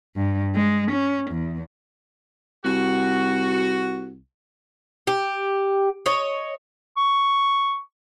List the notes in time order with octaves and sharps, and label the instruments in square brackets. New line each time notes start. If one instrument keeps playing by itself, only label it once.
[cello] G2
G#3
C#4
E2
[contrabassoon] C2 [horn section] F#4
[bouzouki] G4
C#5 D#5
[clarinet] C#6